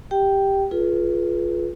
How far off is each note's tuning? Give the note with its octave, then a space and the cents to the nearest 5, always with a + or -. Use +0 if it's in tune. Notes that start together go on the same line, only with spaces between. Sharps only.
G4 +5 G5 -5
F4 +0 G#4 +35 B4 -15